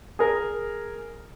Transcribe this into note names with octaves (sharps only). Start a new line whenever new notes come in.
G#4 A#4